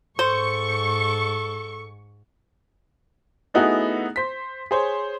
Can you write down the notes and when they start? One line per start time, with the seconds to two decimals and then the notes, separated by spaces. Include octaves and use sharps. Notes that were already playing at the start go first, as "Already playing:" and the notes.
0.19 G#2 A4 C5 C#6
3.54 A3 B3 D#4 E4 F#4 G#4
4.16 C5 B6
4.71 G#4 C5 C#5